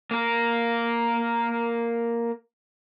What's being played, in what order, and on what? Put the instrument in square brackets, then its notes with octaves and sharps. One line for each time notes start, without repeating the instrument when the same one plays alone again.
[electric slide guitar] A#3 A#4